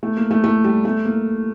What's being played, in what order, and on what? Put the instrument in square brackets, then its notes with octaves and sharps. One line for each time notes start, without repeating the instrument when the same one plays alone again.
[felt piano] A3
A#3
A3
A3
G3
A3
A#3